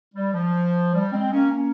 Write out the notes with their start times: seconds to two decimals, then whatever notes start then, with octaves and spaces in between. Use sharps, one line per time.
0.15 G3
0.34 F3
0.94 G3
1.12 G#3 C4
1.32 A#3 C#4
1.52 A#3 C#4